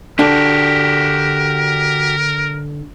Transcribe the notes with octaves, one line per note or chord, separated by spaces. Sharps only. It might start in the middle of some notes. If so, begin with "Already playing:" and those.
D3 D4 F#4 G4 A#4